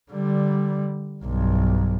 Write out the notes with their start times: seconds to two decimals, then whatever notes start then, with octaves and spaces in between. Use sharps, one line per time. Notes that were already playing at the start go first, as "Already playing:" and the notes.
0.12 D3 G3
1.24 B1 G2